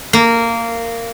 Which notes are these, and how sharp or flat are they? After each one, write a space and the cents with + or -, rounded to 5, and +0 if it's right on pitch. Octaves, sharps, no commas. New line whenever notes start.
A#3 -15